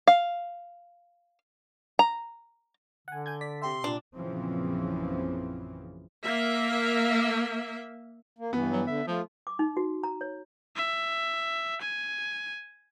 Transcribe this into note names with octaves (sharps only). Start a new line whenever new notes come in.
F5
A#5
D3 F#5 G#5
G#5 G6 G#6
D5 B6
C3 G4 E5 C6
A#2 D4
A#1 F#2 C#3 E3 F3 C4
A#3 E5
A#3
G2 E3 B3
F#3
D3 E5
F3 A3 F4
D6
D#4
F#4
A#5
C#5
E5
G#5